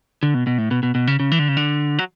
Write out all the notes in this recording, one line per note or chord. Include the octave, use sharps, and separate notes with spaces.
D3
B2
B2
A2
B2
B2
B2
C#3
C#3
E3
D3
C#3
D3
F#3